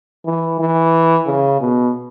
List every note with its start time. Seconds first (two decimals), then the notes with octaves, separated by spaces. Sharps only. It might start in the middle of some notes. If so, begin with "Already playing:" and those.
0.26 E3
0.59 E3
1.27 C#3
1.60 B2